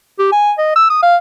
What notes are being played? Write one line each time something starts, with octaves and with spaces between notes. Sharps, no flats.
G4
G#5
D#5
E6
D#6
F5